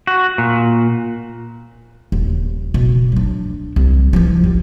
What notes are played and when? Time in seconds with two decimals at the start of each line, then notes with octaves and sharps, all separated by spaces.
0.07 F#4
0.38 A#2
2.12 D#1
2.74 B2
3.12 F#3 D4
3.76 C2
4.13 E3 F3
4.44 G3